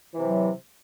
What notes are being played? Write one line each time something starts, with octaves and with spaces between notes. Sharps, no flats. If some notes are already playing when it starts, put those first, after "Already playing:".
C3 E3 F#3